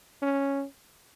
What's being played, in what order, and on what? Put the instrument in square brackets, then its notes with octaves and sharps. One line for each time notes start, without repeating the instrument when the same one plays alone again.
[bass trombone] C#4